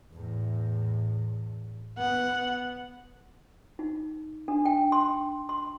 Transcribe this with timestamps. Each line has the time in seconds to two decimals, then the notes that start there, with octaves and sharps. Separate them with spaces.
0.13 E2 A2
1.98 B3 F#5
3.79 D#4
4.48 D4
4.65 G5
4.92 C6
5.49 C6